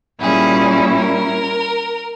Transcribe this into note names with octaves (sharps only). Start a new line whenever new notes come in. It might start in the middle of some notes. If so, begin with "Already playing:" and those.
A#2 G3 C#4 E4 G#4
A#4